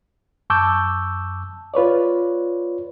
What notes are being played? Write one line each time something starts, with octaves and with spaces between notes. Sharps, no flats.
F#2 A5 C#6 D6 E6 G6
F4 B4 C#5 D5